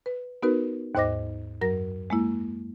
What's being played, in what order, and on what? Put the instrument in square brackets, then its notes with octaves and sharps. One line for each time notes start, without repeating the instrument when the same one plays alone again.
[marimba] B4
B3 D#4 F#4 A#4 B4
D#2 G#2 C5 D#5 D6 A#6
F#2 F#3 A#4 A#6
G#3 A#3 E4